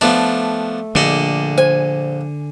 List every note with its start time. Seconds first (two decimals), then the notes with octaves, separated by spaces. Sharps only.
0.01 F3 A3 B3 D4
0.95 A#1 D3 D5 D#5
1.58 C5 G#5